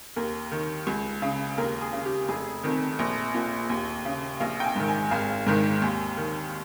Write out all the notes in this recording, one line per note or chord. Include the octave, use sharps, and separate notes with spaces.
D#2 A#4
D#3
C#2
C#3
D#2 A#4
G#4
C#3
G4
F1 G#4
F2 D#3
A#1
A#2
D#2
C#3
A#1 F5
G5
G#5
G#2 D#3
G#5
G#1 F5
G#2 D#3
D#2 G#5
D#3